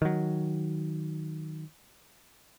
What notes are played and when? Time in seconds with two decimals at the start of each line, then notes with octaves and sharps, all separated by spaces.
0.02 D#3 F#3